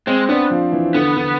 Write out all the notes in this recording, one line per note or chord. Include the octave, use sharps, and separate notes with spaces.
G#3 C4
B3 D4
F3
E3
D3 B3
D3